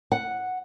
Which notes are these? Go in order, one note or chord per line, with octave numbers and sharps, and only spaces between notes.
F#5